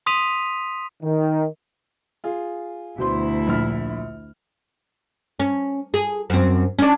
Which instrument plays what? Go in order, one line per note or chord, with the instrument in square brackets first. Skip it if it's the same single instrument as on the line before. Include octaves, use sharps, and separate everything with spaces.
[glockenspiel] C6 D#6 B6 D#7 F7
[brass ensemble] D#3
[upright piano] F4 G#4
[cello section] D2 E4 [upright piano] B2 C5 C6
[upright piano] A#1 F6
[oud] C#4
G#4
F#2 C4
C#4 D4